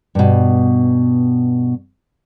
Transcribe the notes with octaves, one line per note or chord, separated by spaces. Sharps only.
G2 B2